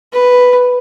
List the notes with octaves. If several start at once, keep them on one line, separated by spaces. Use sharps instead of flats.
B4